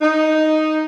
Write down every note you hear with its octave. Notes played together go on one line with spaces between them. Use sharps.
D#4